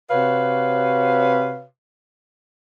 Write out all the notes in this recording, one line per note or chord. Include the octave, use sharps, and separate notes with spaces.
C3 F#4 B4 C#5 F5